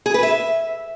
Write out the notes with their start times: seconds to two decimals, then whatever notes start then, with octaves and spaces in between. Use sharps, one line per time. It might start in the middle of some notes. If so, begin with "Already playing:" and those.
0.06 G#4
0.14 B4
0.23 E5